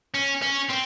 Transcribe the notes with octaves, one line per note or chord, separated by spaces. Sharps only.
C#4
C#4
C4